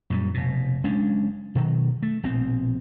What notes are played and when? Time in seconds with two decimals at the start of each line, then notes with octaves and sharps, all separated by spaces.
0.10 F#2 A#2 G3
0.34 F1 B2
0.84 F#1 G#3 C#4 D4
1.55 B2 D#3 F#3
2.03 A3
2.23 A#1 B2 C4